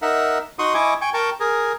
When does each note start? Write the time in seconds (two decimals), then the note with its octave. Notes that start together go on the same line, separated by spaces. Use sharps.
0.02 D#4 A#4 E5 F#5
0.59 D#4 F#4 F#5 C6 C#6 D#6
0.74 E4 D#5 G#5 C#6 D6
1.01 G5 G#5 C#6
1.14 A#4 G5 A5 C#6
1.40 G#4 A#4